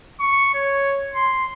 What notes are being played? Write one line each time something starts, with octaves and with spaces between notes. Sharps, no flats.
C#6
C#5
C6